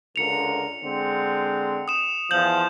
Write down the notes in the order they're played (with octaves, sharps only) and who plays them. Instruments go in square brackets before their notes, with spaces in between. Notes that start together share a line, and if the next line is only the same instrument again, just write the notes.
[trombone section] C#2 D3 A#4 [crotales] C#7 F7
[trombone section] D3 G#3 C4
[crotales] D#6 E7
[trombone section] E2 F3 [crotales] G6 F#7